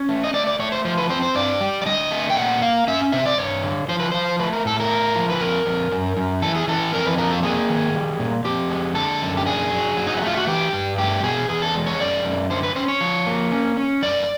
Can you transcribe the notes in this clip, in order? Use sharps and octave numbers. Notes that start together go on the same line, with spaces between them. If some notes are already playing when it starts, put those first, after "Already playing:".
Already playing: C#4
A3
D#5
A3 D5
D5
A3 C#5
C5
F3 C5
B4
C4 C5
C5
G2 D5
G3
D5
D3 D#5
A3
G5
A#2 F#5
A#3 F5
C#4 E5
C3 E5
D5
G2 C#5
D3
F3 C5
B4
F3 C5
A3 B4
A#4
A2 A4
A#4
A3
F3
B4
F2 A#4
F2
F#2
F#2
E3 A4
G#4
E3 A4
F2 A#4
B4
F3 A#4
A4
A#3 G#4
D#3
G3
A#2
F2 G4
G#3
D3 A4
F#2
G4
D4 G#4
F#3
F#3
D#4
E4
A3 F4
F#4
E3 G4
G2
A3 G4
B2 G#4
E2 G#4
A4
G#3
C#5
F#2 D5
F#2
D3 C5
B4
C#4 C5
C#5
F3
A#3
C#4
C#4
F#2 D5